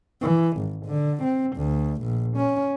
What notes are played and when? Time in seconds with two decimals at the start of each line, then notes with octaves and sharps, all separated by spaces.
0.21 E3
0.57 G#1
0.86 D3
1.23 C4
1.57 D2
2.02 A#1
2.37 C#4